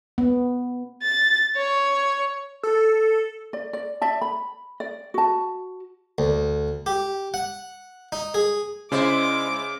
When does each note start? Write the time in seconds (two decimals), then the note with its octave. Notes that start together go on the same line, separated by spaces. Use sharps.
0.18 B3
1.02 A6
1.56 C#5
2.63 A4
3.53 D5
3.73 D5
4.01 D5 E5 A5
4.21 B5
4.80 D5
5.14 F#4 A5
6.18 D2
6.86 G4
7.34 F#5
8.12 D#4
8.34 G#4
8.92 C#3 G#3 E4 C5 D5 D6